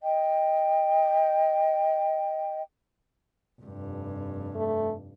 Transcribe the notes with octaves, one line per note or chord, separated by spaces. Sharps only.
D#5 G5
F1 G2
A3